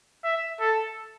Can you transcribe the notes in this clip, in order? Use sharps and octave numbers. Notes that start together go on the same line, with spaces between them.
E5
A4